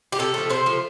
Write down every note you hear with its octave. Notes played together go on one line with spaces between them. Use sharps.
G4
C3 A4
F3 A3
C3 C5
F3 A3